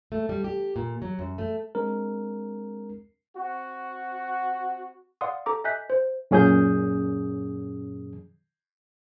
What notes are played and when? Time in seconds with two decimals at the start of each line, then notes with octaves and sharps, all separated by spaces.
0.12 A3
0.29 G3
0.44 G4
0.76 A#2
1.02 F#3
1.19 F#2
1.38 A3
1.75 G#3 C4 D4 A#4
3.37 C4 F#4
5.21 D5 F5 F#5 C6 D#6
5.46 A4 A#5 D6
5.64 D#5 E5 G#5 F#6 G6 B6
5.90 C5
6.31 F#2 A#2 C#4 G#4 D#6 G6